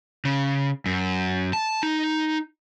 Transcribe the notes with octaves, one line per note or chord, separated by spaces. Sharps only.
C#3
F#2
A5
D#4